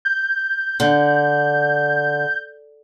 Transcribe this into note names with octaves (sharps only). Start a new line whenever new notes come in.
G6
D3